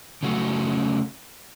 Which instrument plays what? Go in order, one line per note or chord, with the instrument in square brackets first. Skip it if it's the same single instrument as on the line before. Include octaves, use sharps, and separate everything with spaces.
[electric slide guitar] C#3 F#3 A3 C#4 F#4